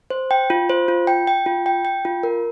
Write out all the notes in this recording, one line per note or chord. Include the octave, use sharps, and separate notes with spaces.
C5
G5
F4
C5
F4
G5
G5
F4
G5
G5
F4
A#4